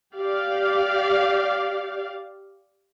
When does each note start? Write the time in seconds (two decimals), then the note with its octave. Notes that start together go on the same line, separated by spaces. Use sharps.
0.15 G4 D5 F5